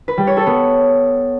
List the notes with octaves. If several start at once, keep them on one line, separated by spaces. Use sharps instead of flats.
B4
G3
C#5
A4
B3